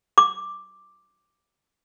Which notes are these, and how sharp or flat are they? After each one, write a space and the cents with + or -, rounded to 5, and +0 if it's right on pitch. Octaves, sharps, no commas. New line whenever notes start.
D6 +5